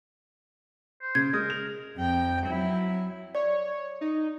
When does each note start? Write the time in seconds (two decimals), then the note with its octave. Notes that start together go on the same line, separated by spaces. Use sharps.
1.01 C5
1.15 C#3 G#6
1.33 G#3 A#4 D#6
1.50 F7
1.97 F2 G5
2.47 F#3 E4
3.35 C#5 D5
4.01 D#4